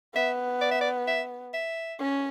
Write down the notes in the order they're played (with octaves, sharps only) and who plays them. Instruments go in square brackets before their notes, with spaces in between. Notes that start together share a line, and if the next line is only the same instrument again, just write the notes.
[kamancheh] B3 [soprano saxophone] E5
[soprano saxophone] D5
E5
D5
E5
E5
[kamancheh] C#4